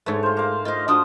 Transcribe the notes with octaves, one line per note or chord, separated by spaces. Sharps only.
G#2 A3 B4 C#5
F4 C5
A#3 F5
F4 C5 D#5
F3 D4 F4 F#4 D#5 D#6